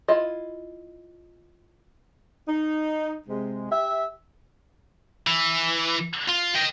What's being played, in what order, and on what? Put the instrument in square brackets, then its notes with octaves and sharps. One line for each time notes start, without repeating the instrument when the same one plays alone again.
[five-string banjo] E4 F4 D#5
[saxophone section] D#4
C3 G#3
G4 E5
[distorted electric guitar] E3
F4
D#5 G5